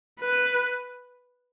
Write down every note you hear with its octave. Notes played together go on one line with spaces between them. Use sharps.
B4